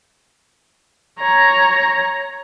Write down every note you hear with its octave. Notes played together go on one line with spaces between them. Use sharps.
C#5 A#5